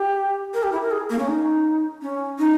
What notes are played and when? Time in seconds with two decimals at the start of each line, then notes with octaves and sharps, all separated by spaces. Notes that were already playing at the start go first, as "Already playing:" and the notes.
Already playing: G4
0.54 A#4
0.63 G4
0.72 E4
0.82 A#4
0.91 G#4
1.10 A#3
1.19 C#4
1.28 D#4
2.02 C#4
2.39 D#4